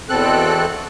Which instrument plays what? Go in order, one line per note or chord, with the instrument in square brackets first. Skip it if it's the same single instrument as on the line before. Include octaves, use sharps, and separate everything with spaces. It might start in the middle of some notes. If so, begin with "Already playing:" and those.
[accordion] E2 B2 C4 A4 F#6